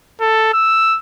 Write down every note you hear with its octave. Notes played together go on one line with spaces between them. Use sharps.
A4
E6